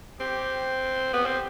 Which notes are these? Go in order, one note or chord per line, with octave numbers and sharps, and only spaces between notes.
C4 G4
B3 G4
C4